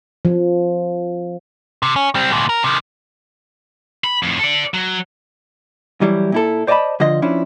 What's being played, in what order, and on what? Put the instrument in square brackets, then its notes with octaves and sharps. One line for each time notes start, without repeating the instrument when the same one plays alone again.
[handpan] F3
[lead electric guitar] C3
C#4
G3 C4
D2 A#2
A#4
C3 D#3
[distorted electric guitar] B5
F2 A2
A4 D5
F#3
[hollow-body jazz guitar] E3 F#3 G3 E4
A#2 E4 A4
C5 D5 D#5 F5 A5 B5
D3 F3 F4 D#5
F3 C#4 D4 E4